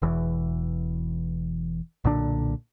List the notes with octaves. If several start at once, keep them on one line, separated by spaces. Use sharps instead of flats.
E1 E2 E3
B1 A#2 D3 D4